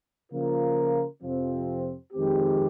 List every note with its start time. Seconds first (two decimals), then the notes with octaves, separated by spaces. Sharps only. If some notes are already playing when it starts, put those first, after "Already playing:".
0.32 C#3 F3 A#3 F4 A#4
1.23 F2 C3 F3 C4
2.13 F2 D#3 G#3 C4 G4